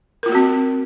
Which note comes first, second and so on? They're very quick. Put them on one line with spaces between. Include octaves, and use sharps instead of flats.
A#4 F4 A#3 F#4 C4